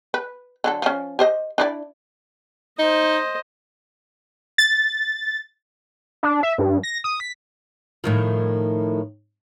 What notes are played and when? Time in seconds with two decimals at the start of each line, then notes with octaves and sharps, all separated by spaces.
0.14 B4
0.64 D3 F#3 A4
0.82 F3 C#4
1.19 G4 C5 D#5
1.58 D4 E4 D5
2.79 D#4 C5 D#5
4.58 A6
6.23 D4
6.43 E5
6.58 G2
6.83 A#6
7.04 D#6
7.20 B6
8.04 A2 D#3 F3